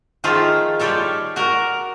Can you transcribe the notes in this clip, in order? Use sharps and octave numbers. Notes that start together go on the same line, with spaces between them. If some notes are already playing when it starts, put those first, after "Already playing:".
D#3 F3 A3 F4 G#4 A4
G3 F4 G4 A4 C#5
F#4 A#4